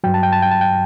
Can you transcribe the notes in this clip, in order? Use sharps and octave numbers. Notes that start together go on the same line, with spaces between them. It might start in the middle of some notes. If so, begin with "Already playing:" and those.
G2 F#3 G5
A5
G5
A5
G5
A5
G5